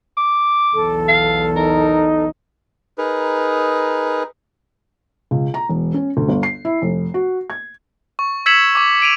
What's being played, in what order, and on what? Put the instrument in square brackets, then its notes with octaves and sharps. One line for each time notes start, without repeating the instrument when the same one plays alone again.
[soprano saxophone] D6
[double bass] B1 E2 [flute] A4
[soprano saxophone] F5
[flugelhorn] D#4 [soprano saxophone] A#4
[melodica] D#4 G#4 A#4 B4
[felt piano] C#2
A#5
E1
C#4
D2
G1
C7
E4
F1
F#4
G#6
[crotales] C#6
E6 G#6 B6 C#7 E7 F#7
C#6 D6
D7 D#7 F7